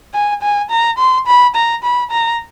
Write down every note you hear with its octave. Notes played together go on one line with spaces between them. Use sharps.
G#5
G#5
A#5
C6
B5
A#5
B5
A#5